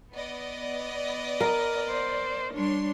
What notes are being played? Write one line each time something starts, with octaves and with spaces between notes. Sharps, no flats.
B3 D5 D#5
A#4
C5
G3 D4 C#5 C6